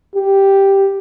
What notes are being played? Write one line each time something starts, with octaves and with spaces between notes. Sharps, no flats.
G4